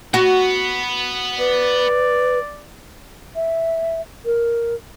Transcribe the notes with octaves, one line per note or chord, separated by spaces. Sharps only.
B3 F#4
B4 D5
E5
A#4